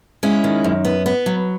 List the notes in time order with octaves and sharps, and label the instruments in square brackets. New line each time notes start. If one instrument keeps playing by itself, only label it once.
[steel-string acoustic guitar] G#3 C#4 E4
D#3
F#2
B3
B3
F#3